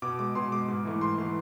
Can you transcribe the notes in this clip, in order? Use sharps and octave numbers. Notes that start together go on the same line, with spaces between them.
B2 D6
G#3 D6
B2 C6
G#3 D6
G#2
E3 A3
G#2 C6
E3 A3